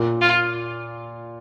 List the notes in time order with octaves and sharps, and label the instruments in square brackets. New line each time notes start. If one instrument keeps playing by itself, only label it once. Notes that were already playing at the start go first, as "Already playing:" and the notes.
Already playing: [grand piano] A#2
[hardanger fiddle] F4